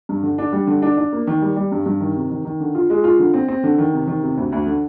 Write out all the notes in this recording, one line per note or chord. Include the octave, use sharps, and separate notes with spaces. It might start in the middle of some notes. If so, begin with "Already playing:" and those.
G2
D3
D4
G3
D3
D4
D4
A#3
D#3
G3
G3
G2
G2
D#3
C3
D#3
D#3
D3
F4
G#3
F4
D3
C4
C4
D3
D#3
C3
D#3
C3
D2
D2
D3